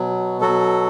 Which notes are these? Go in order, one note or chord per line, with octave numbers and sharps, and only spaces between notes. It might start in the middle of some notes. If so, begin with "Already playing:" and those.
Already playing: B2 F#3
B2 F#3 F#4 A4